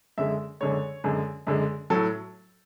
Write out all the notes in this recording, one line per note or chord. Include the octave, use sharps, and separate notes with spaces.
F#2 D3 G#3 E5
F#2 D3 G#3 C#5
F#2 D3 G#3
F#2 D3 G#3
A2 F#3 A4